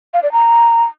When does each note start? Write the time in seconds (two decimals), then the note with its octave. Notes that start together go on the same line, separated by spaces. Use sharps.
0.14 F5
0.23 D5
0.32 A#5